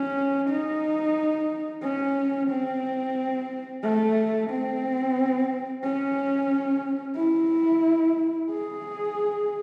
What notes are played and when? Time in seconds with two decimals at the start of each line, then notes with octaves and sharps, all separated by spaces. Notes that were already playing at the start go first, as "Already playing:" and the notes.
Already playing: C#4
0.49 D#4
1.83 C#4
2.49 C4
3.83 A3
4.50 C4
5.83 C#4
7.17 E4
8.51 G#4